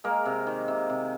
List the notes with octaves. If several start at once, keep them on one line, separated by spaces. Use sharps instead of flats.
G#3 A#3 A#4
C3
D#3
C3
C3